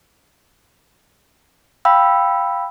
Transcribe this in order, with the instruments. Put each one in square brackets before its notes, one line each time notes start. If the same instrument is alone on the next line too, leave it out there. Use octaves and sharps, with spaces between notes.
[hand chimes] F5 G5 B5 E6